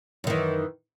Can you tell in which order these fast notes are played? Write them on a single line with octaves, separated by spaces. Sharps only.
F#2 D#3 E3